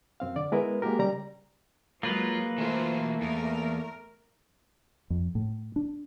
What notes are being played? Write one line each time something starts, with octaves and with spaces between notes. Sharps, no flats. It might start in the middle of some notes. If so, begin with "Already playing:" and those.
F#2 C4 F5
D3 D5
G#3 B3 E4 A#4 B4
G#3 A#3 F#4 G4 A#4
C#3 G3 D5 A#5
F#3 G#3 A#3 F4 B4
E3 F#3 A3 F4 C5
E2 A#4
F2
A2
D4